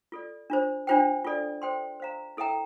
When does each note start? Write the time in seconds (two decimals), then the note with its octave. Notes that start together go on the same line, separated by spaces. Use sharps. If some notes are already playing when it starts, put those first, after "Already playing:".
0.12 F4 A4 D5
0.50 D4 F4 C5
0.87 D4 F4 C5 G5
1.25 F4 A4 D5
1.62 A4 C5 G5 C6
2.00 C5 F5 A#5
2.37 E4 A4 E5 G5 A#5